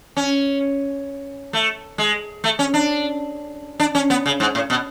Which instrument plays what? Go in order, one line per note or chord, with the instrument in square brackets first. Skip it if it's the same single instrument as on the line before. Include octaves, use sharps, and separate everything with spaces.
[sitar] C#4
A3
G#3
A3
C#4
D4
D4
C#4
B3
C#3
G#2
A2
B2